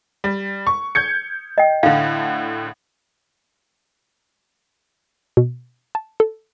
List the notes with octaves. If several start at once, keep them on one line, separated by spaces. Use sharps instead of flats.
G3
C#6
G6 G#6 C#7
D#5 G5
A2 D3 F5
B2
A5
A4